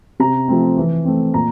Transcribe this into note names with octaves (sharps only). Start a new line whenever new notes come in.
C3 A#5
F3 A3 C4
E3
A3 C4
A#2 A#5